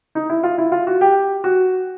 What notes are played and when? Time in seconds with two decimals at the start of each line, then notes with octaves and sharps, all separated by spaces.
0.15 D#4
0.30 E4
0.43 F4
0.58 E4
0.72 F4
0.87 F#4
1.01 G4
1.44 F#4